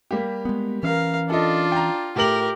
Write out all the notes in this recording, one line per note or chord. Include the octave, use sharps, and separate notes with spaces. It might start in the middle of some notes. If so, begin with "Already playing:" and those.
G3 A#3 G4
G#3 B3
E3 C#4 A#4 F5
D4 F4 A4 D#5
G5 A#5
A2 G4 A#4 F#7